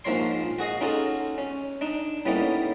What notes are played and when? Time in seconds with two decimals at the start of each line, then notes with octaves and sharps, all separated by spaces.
0.05 A#1 G#2 F3 A#3 C#5 C6
0.59 F#4 G#4 D#5 F5
0.81 C#4 D#4 F4 F#4 G#4 A4
1.38 C#4
1.81 D4 D#4
2.26 A2 G3 A#3 B3 C#4 D#4